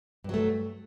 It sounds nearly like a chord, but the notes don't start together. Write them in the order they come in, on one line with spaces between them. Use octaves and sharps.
G2 F#3 A3